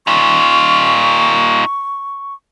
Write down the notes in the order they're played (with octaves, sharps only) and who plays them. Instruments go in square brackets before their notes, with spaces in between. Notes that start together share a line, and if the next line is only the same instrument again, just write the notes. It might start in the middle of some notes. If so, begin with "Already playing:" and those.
[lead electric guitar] D#4 F4 [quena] C#6